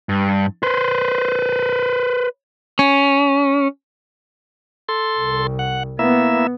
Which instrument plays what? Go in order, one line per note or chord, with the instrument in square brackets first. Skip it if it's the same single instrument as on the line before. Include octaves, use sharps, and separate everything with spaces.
[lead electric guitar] G2
B4 C5
C#4
[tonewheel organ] A4 C6
[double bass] C2
[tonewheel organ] F#5
[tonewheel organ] A#3 E4 E5 [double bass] B3